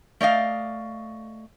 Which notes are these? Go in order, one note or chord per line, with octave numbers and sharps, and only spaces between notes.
A3 D5 D#5 F5